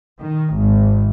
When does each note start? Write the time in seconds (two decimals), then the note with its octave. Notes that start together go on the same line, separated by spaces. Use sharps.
0.20 D#3
0.54 G#1